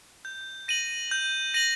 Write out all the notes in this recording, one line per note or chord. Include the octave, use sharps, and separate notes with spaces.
G6
A#6 D#7 F#7
G6
A#6 D#7 F#7